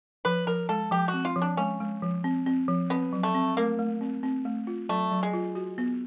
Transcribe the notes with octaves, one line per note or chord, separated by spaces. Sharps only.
F3 B4
F3 A#4
G#3 A4
F3 G4
F#4
C4
F4
F3
D4
G#3 C#4
G#3
F3
C4
C4
F3
B3 C4
F#3
A3
C4
A3 A#3
A3
C4
C4
A3
F4
F#3 A3
F#3
G#3
F4
F#4
B3